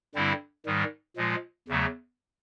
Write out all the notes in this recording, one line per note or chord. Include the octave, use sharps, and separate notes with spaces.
G2 D3 G3 C4 E4
G#2 D#3 G3
A#2 F3 G#3
E2 C#3 F#3 A3